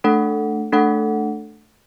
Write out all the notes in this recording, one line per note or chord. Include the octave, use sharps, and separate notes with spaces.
A3 D4 A4 F#5
A3 D4 A4 F#5